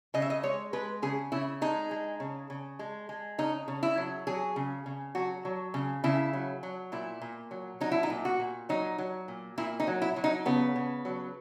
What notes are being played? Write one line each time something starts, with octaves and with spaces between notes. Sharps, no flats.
C#3 D#5
E5
D#5
G#3 C#5
G#3 B4
C#3 G#4
C#3 E4
G#3 D#4
G#3
C#3
C#3
G#3
G#3
C#3 D#4
C#3
E4
F#3
F#3 G#4
C#3
C#3
F#3 F#4
F#3
C#3
C#3 E4
F#3
F#3
A#2 E4
A#2
F#3
F#3 D#4
E4
D#4
A#2
F#4
A#2
F#3 D#4
F#3
A#2
A#2 E4
D#4
F#3
E4
F#3
D#4
C#3 B3
C#3
F#3